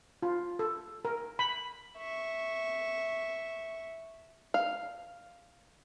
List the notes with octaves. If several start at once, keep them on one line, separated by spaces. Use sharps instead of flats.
F4
A4
A#4
B5
E5 C#6
F5